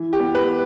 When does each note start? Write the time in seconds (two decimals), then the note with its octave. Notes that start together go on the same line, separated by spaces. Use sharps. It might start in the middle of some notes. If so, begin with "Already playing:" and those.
Already playing: E3
0.13 G4
0.20 B3
0.35 B4